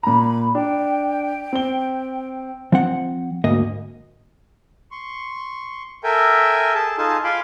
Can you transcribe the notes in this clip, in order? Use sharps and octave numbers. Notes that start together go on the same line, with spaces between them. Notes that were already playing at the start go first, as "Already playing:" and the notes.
A#2 A#5 B5
D4 G5
C4 G7
F3 C4 F#5
D2 G#2 A#3 D#5
C6 C#6
A4 A#4 E5 G5 G#5
G#4 A4 A5
D#4 F4 G#4 A4 G#5 A5
F4 F5 G#5 B5 C6 D6